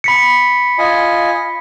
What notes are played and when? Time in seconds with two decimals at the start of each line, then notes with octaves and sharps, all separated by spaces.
0.04 B5 B6 C#7
0.78 F4 D#5 G#5